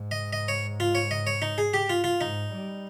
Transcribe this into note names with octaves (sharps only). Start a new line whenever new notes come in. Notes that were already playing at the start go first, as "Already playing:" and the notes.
Already playing: G#2
D#5
D#5
C#5
F4
C#5
D#5
C#5
D#4
G#4
G4
F4
F4
G#2 D#4
G3